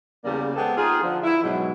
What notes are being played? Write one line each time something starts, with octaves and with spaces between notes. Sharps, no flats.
E2 C#3 G3 A#3 D5
G#3 B3 C4 G4 A4
D#4 F4 G#4
D3 F3
E4
G#2 B2 E3 F#3